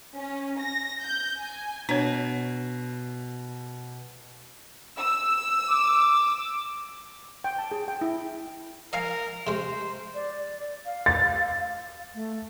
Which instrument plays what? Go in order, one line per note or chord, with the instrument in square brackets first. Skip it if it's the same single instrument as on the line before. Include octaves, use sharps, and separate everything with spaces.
[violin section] C#4
A#6
G6
G#5
[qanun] B2 [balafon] D4 C#5
[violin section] E6
[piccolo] D6
[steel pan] G5
A5
G#4
G5
E4
[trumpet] A#4 [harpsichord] D#5 F5 G#5
[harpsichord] C3 G#3 [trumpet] C5
[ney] D5
F5
[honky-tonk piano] A6
[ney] A3